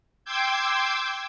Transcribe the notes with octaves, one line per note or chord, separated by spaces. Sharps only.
G5 C6 D6 E6 G6 G#6